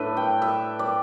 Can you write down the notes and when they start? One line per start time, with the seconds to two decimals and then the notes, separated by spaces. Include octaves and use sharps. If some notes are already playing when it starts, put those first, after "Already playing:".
Already playing: A2 A3 D4 B4 E5
0.17 G5
0.42 E5
0.79 D5